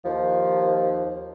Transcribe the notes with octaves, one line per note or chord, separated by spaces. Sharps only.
D#2 F3